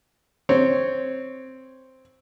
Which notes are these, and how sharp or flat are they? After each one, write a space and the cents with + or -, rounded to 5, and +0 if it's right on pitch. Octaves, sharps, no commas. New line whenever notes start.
C4 +0 C#5 +0